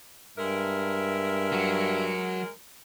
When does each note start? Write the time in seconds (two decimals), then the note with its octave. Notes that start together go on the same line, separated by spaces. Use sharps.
0.38 G2 G#3 A#4 E5
1.52 F#3